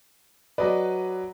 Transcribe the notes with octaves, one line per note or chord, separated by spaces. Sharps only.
F#3 B4 D5 D#5